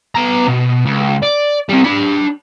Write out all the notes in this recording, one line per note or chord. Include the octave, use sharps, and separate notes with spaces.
B3 A#5
B2
C#2
D5
G3 C4
D4 B5